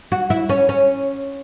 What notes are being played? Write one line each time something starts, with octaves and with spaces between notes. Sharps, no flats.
F#4
E4
C#4
C#4